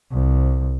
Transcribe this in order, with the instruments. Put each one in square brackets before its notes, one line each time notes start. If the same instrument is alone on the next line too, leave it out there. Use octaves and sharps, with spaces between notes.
[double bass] C2